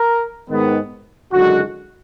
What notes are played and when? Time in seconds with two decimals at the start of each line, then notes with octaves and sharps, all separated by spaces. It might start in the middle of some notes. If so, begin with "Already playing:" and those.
Already playing: A#4
0.50 G#2 D#3 G#3 B3
1.32 F#1 F#2 D3 G#3 F#4